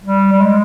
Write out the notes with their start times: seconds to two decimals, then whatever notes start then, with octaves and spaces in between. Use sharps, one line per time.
0.03 G3
0.32 G3
0.41 G#3